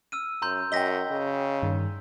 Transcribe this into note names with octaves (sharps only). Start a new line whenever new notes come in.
E6 F6 D#7
F#2 A#5 C6 G6
F#2 D#5 G5 A#6 B6 G7
C#3
G2 D#3